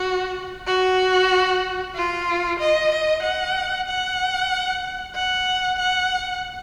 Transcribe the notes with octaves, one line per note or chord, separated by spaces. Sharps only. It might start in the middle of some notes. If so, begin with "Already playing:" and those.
Already playing: F#4
F#4
F4
D#5
D#5
F#5
F#5
F#5
F#5